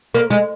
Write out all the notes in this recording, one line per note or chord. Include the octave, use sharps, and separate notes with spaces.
A#3
G#3